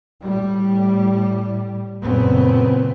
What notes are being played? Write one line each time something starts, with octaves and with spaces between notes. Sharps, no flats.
A2 G3
F#1 A#2 C#3 B3 C4